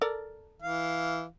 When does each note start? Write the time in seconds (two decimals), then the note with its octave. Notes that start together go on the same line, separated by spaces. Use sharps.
0.01 A4 A#4 D5
0.62 E3 F5